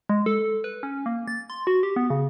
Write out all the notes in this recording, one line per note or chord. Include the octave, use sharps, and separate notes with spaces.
G#3
A4
B4
C#4
A#3
A6
C6
F#4
G4
B3
C#3